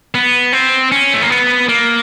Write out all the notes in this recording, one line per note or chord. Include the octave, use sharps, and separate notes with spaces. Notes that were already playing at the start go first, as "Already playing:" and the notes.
B3
C4
C#4
A3
A#3
B3
A#3